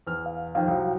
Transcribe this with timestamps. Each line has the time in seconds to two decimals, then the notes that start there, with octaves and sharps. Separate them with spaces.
0.07 E2 F6
0.26 F5
0.55 F2 D#3 F5 G5
0.67 C2 F#3